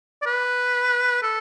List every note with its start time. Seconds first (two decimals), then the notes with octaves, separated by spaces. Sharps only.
0.22 D5
0.26 B4
1.23 A4